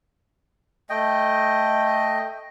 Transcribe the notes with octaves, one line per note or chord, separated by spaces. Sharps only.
A3 D#5 G5